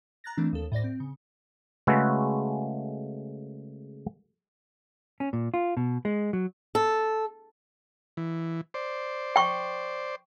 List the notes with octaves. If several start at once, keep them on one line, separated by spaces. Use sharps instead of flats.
A#5 F#6 A6 A#6
E3 A3 A#3 C4 D4
D#2 A4
A2 C5 D5 A#6
C4
C#3
C#3 G#3 A3 F#4 A4 B4
C#4
A#2
F4
B2
G#3
F#3
A4
E3
C5 D5
G5 C#6